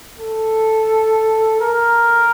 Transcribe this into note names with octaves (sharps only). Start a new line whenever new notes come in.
A4
A#4